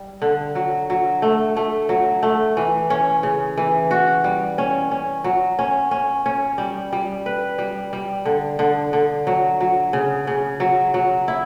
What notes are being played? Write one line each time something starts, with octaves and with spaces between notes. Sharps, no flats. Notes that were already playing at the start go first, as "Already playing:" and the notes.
Already playing: G3
D3
F#3
F#3
A3
A3
F#3
A3
E3
C#4
C#3
E3
F#4
G3
C#4
C#4
F#3
C#4
C#4
C#4
G3
G3
B4
G3
G3
D3
D3
D3
F#3
F#3
C#3
C#3
F#3
F#3
E4